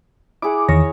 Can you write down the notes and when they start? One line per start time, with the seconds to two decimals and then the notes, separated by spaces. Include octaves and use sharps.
0.42 E4 G#4 F#5 D6
0.68 E2 D#3 C#5 A#6